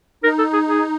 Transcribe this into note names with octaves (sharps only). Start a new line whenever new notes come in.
D#4 A#4
A4
G#4
G#4